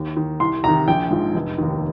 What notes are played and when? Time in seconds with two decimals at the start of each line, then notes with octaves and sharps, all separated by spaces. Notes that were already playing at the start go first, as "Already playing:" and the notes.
Already playing: D#2
0.17 D#3
0.40 C2 C6
0.64 C3 D#3 A#5
0.88 A#1 G5
1.11 G#2 F3
1.35 F1
1.58 D#2 D#3